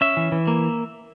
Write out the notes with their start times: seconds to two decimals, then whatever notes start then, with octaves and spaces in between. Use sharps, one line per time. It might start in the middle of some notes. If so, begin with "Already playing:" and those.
0.01 C#4 E5
0.17 E3
0.32 E3
0.47 A#3